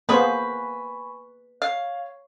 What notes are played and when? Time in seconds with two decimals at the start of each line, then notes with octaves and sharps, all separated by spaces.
0.09 A#3 B3 G#4 B4 C5 G#5 B5 C#6
1.62 C#5 F5